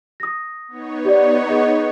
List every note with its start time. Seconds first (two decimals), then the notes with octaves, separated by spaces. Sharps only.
0.20 D#6 A#6
0.68 B3 D#4 C#5
1.05 G4 D5
1.46 G#4 D#5 A#5